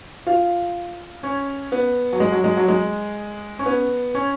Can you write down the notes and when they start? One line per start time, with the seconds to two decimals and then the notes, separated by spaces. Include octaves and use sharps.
0.27 F4
1.23 C#4
1.72 B3
2.13 F#3
2.20 G#3
2.32 F#3
2.44 G#3
2.57 F#3
2.68 G#3
3.59 C#4
3.66 B3
4.15 C#4